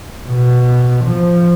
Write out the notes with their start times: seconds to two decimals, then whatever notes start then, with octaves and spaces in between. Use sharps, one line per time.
0.27 B2
1.05 F3